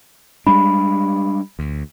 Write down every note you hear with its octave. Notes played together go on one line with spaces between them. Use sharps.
G3 G#3 D4 B5
D2